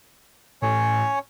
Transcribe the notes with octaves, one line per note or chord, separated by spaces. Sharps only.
A2 C#4 C#5